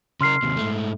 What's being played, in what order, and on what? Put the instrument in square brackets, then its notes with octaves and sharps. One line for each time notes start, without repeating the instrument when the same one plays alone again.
[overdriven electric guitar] C#3 A#4 [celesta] C6 F6 C7
[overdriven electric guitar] D#2 C3
G#2 A3